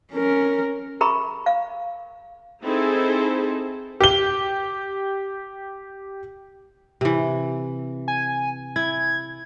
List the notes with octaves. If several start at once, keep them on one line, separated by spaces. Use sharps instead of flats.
C#4 A#4
G#4 A#4 E5 A#5 B5 C#6
F5
C4 D#4 E4 G#4 A4 C5
G4 G7
C3 E3
G#5
E4 G#6